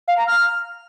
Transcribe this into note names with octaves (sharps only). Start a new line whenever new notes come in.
F5
A#5
F6